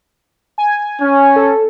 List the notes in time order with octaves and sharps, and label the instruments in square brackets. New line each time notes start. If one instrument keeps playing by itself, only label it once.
[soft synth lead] G#5
[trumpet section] C#4
[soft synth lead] A4